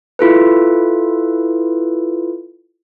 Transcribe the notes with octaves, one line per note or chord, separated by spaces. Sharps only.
E4 F4 A4 B4